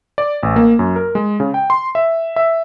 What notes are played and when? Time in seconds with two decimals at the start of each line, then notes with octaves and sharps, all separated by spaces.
0.18 D5
0.43 A1
0.56 A#3
0.79 F#2
0.96 A#4
1.15 G#3
1.40 C#3
1.54 G5
1.70 C6
1.95 E5
2.36 E5